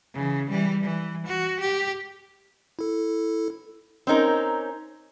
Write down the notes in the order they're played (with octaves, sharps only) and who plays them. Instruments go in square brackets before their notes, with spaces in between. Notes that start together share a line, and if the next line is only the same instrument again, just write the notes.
[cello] C#3 E3
E3 G3
E3
F#4
G4
[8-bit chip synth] E4 A4
[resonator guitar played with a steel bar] C4 C#4 D#4 A#4